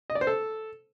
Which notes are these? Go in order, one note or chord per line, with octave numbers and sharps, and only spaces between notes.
D#5
D5
C5
A4